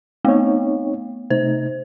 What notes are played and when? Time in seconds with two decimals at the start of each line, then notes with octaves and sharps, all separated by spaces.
0.25 A3 B3 C4 D#4 C#5
1.30 C3 A3 D#4 C5